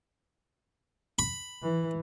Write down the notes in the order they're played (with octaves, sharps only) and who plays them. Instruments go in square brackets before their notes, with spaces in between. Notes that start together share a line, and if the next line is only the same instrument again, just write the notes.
[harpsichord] B5
[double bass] E3